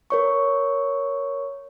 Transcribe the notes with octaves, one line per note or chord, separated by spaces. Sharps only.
A#4 C#5 C#6